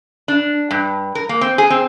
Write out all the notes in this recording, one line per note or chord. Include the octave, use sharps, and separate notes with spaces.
D4
G2
A#4
A#3
C4
G#4
C4